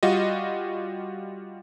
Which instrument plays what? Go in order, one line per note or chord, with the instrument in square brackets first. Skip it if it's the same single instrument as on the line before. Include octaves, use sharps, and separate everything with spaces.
[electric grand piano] G3 F4 F#4 D#5